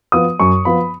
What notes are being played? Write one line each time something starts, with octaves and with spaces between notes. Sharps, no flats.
F3 B3 D#6
F#2 C#6
F3 B3 B5